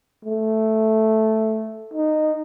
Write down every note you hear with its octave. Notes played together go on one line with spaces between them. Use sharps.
A3
D#4